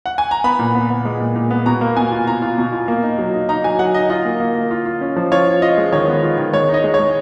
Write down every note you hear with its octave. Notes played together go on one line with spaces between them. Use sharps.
F#5
G#5
A#5
B3 B5
A#2
B3
B3
G#3
A#2
A#2
B3
B2 A#5
A#3
B2 G#5
F4
F4 A#5
F4
B2
F4
A#3
D#4
F#3
D#4
D#4 A#5
F#3 G#5
F#3 F#5
D#4 D#5
F4 D#5
A#3
A#3
A#3
F4
F4
C#4
F3
F4 C#5
F4
F4 D#5
G#3
D#3 C#5
B3
F4
D#3
G#3 C#5
D#4
D#5
G#3
C#5
G#3